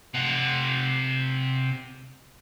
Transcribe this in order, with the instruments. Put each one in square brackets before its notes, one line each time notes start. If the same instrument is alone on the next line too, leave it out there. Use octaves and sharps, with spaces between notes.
[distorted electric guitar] C3 F#5